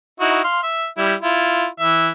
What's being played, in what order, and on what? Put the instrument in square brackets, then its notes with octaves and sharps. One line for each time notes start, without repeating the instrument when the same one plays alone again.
[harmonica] D#4 E4 F#4
F5 C6
E5
G3 E4
E4 F4
E3 E5